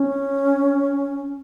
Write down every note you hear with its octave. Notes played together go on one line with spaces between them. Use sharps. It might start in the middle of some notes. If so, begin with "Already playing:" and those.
Already playing: C#4